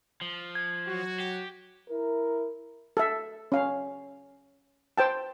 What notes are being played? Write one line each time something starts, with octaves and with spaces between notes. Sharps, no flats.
F3
G#6
F#3 F#4
G4
E4 A#4
A4 E5
C#4 F5
C5 G5 A5